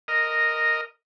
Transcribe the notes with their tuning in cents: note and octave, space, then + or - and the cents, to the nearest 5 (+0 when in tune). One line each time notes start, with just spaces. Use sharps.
A#4 -5 D#5 +0